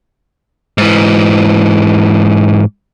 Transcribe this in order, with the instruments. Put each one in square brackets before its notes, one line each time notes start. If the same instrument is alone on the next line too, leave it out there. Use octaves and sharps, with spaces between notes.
[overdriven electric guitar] G#2 E3